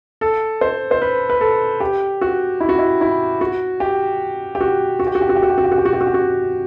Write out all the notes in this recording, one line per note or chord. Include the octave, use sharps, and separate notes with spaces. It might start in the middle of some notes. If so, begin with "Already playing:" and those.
A4
C5
C5
B4
B4
A4
G4
F#4
E4
F#4
E4
E4
F#4
G4
G4
F#4
F#4
G4
F#4
G4
F#4
G4
F#4
G4
F#4
G4
F#4
G4
F#4
G4
F#4
G4
F#4